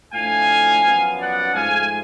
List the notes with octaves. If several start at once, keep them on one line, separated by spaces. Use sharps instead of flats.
A2 F3 A3 D4 F5 G#5
F#2 F3 B3
D5 F#5
G#2 F3 A3 F5 G#5